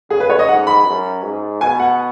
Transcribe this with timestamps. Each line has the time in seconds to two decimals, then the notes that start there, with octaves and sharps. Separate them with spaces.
0.10 C#3 G#4
0.20 B4
0.30 C#5
0.39 D#5
0.48 G#2 F#5
0.67 B5
0.86 F#2
1.23 G#2
1.61 B2 G#5
1.80 F#5